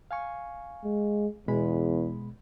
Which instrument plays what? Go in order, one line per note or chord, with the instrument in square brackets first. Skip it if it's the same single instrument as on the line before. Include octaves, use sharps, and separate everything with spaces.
[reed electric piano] F5 G#5 C#6
[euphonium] G#3
[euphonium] E2 [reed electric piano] B2 G#3 B5